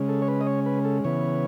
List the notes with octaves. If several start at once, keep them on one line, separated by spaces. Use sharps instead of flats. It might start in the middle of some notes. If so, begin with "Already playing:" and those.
Already playing: C#3 G#3 C#4
A4
C#5
B4
D#5
C#5
B4
A4
C#3 E3 B3 C#5